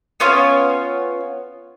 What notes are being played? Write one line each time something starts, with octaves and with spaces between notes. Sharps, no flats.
B3 C#4 F4 C#5